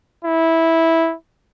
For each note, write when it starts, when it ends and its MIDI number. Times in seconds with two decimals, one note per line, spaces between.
0.25 1.14 64